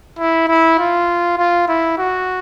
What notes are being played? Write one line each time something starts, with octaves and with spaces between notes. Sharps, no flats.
E4
E4
F4
F4
E4
F#4